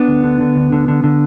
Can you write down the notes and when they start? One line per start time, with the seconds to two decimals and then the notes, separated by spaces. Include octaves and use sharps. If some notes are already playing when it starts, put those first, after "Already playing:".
Already playing: B3 D4
0.08 D2
0.24 D3
0.41 D3
0.56 D2
0.72 D3
0.88 D3
1.04 D3